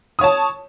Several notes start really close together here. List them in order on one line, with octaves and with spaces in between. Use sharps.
D#6 C#5 A5